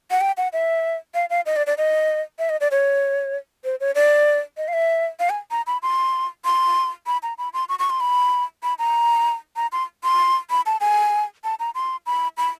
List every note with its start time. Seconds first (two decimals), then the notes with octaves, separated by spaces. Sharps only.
0.11 F#5
0.21 G5
0.37 F#5
0.53 E5
1.14 F5
1.30 F5
1.46 D#5
1.56 D5
1.67 D5
1.78 D#5
2.39 E5
2.50 D#5
2.61 D5
2.71 C#5
3.65 C5
3.80 C#5
3.95 D5
4.57 D#5
4.68 F5
4.73 E5
5.19 F5
5.30 G#5
5.51 A#5
5.67 B5
5.82 C6
6.45 C6
7.07 B5
7.23 A#5
7.38 B5
7.54 C6
7.69 C#6
7.79 C#6
7.90 C6
8.00 B5
8.63 B5
8.79 A#5
9.56 A#5
9.72 C6
10.04 C6
10.50 B5
10.66 A5
10.80 G#5
11.44 A5
11.60 A#5
11.75 C6
12.06 B5
12.37 B5